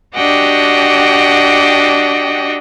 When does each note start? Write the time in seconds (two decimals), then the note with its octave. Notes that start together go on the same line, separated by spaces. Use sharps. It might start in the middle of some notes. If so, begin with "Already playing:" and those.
0.14 D4 F#4 G4 D#5 F#5 G5